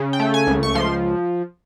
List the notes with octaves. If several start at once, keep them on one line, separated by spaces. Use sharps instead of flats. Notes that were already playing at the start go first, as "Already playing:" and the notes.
Already playing: C#3
G5
A3
G#5
C#2
C#6
F3 C6